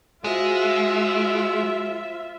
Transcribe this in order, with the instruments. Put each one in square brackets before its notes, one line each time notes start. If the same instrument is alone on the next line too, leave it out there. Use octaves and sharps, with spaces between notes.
[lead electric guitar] G#3 [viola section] F4 E5 [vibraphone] F#4 C5 F#5